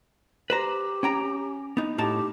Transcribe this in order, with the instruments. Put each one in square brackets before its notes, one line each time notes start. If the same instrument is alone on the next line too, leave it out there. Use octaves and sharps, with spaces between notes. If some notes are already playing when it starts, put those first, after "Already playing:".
[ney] G4 [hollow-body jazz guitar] B4 C5 A#5
[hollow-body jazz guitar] C#4 G5 A#5
B3 D#4
[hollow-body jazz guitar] A2 D#4 A5 [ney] G4